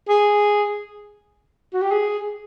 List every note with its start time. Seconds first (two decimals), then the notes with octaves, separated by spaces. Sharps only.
0.09 G#4
1.74 F#4
1.82 G4
1.92 G#4